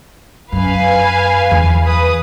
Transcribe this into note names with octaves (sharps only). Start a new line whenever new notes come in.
F#2 B4 F5 G#5
E2 E3
B4 D#6